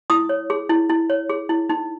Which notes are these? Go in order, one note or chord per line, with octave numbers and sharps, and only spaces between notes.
E4 D#6
C#5
G#4
E4
E4
C#5
G#4
E4
D#4